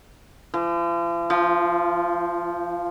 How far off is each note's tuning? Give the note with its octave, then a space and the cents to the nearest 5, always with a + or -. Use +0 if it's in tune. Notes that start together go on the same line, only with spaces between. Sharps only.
F3 -45
F3 -5